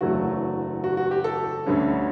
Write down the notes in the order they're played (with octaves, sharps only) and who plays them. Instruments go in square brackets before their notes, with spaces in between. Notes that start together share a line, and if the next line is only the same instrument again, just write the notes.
[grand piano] F#1 E2 D3 F#3 A3 F#4
F#4
F#4
G4
A4
D2 D3 G3 C#4